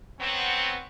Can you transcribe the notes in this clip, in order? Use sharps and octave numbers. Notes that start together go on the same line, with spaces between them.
F#3 B3 C4